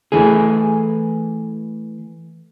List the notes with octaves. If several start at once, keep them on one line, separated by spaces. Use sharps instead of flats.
E3 A3 G#4